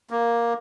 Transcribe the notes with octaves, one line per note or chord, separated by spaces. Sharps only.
A#3